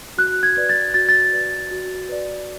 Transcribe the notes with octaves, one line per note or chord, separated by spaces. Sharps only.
F#4 F#6
G#6
B4 D5
A6
F#4 A6
A6
B4 D5
F#4
B4 D5